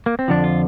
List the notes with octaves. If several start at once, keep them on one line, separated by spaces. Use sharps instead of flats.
A#3
C4
F2 D3 F3 D4
F4